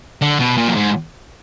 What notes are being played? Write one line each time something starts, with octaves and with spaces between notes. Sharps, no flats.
D3
B2
A#2
F#2
G#2